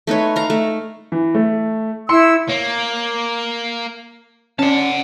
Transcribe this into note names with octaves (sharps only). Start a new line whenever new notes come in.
A3 D#4 B4 C#5
F5 A#5
A3
E3
A3
E4 C6 E6 C#7
A#3 C#5
C#4 D5 F#5 A5